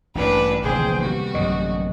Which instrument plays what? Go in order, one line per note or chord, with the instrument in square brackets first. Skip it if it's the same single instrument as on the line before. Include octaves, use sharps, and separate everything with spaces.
[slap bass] A1 G2 A#2 [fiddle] D4 B4
[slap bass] D1 A#1 E3 [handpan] C3 D#3 [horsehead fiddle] G#4 G5 [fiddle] C5
[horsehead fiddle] G3 [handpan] A#3 B3 [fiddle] F#4
[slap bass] A1 F#2 D3 [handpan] D#5